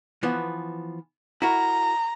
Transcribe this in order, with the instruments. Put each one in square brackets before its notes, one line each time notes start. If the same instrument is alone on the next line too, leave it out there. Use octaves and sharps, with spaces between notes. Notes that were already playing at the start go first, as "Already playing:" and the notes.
[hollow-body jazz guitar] E3 F3 B3
[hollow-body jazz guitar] E4 F#4 A#4 [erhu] A#5